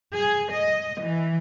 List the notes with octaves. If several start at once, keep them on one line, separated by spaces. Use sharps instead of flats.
G#4
D#5
E3